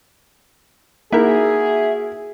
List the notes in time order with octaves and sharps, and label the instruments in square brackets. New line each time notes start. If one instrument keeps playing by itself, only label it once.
[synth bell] A#3 D#4 [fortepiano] E4 A#4 [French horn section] F#4 G#4 [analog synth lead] E5